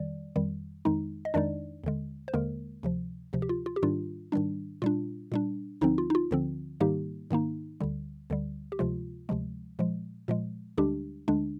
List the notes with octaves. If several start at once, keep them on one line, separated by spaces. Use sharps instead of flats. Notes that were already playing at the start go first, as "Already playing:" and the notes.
Already playing: F2 D#3 G3 D5
F2 D#3 G3
F2 D#3 G#3 D#4
D#5
F2 D#3 G#3 D4 D#4 D5
D#2 D3 G#3
C5
D#2 D3 G#3 A#3 A#4
D2 C3 F3
D2 C3 F3
G4
F4
F4
G4
G#2 D#3 G3 D4 F4
G#2 D#3 G3 D4
A#2 G3 D4 F4
A#2 G3 D4
D2 D3 F3 C4 D#4
F4
D#4
F4
D2 D3 F3 C4
G#2 D#3 G3 A#3 D#4 G4
G#2 D#3 A#3 D#4
D2 D3 G3
D2 D3 G3
G4
D2 C3 F3 G#3 F4
D2 C3 F3 G#3
A#2 F3 G#3
A#2 F3 G#3
D2 D3 G3 G#3 D4 G4
D2 D3 G#3 D4